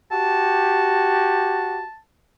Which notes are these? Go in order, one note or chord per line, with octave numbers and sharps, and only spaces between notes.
F#4 G4 A5